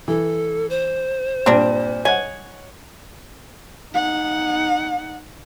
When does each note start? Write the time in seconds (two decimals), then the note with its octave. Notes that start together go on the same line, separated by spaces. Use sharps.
0.08 E3 A4
0.70 C5
1.46 G2 A#2 C4 D4
2.05 C#5 D#5 F#5 G#5
3.93 D#4 F#5